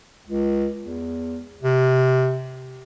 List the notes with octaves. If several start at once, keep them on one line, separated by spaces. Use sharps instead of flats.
C#2
E2
C3